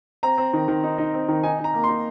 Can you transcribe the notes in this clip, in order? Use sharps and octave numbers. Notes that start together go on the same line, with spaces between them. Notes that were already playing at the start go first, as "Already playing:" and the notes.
C4 A#5
C4
D#3
D#3
D#4
D#4
C4
D#3
D#4 G#5
D#4
A#5
A#3
C6
D#4